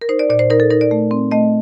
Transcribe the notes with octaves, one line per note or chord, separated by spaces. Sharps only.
A#4
D#4 C5
D5
A#2 D5
C5
D#4 A#4
A4
D#4 A#4
D5
A3
C4
A3 D#5